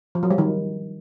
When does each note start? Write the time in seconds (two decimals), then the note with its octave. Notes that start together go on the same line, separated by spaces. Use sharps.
0.15 F3
0.23 F#3
0.31 G3
0.38 D#3